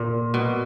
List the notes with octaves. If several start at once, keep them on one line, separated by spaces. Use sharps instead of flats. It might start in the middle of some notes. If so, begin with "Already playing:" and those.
Already playing: A#2
B2